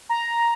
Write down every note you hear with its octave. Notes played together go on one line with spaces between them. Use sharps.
A#5